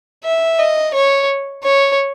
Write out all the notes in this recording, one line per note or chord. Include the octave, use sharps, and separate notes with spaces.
E5
D#5
C#5
C#5